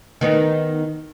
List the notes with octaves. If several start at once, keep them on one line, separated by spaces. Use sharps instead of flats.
D#3 B3 D#4